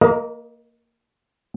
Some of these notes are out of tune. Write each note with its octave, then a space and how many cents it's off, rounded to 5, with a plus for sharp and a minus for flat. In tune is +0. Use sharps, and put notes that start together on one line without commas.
A#3 -15 A#4 +35 D#5 +0